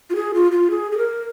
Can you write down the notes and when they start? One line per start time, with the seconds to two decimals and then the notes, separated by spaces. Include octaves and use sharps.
0.10 F4
0.15 G#4
0.34 F4
0.52 F4
0.71 G#4
0.92 G#4
0.98 A#4